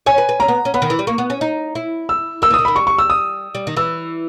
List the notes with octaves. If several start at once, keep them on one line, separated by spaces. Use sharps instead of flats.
C#5 G#5
B4
B4
C#4 A#5
B3
C#4
B3 B5
D#3
E3
G3
A#3 C#6
B3
C#4
D#4
E4
E6
A#3 E6
E3
D#3 D#6
D#3 B5
G3 C#6
C#6
E6
D#6
G3
D#3
E3 E6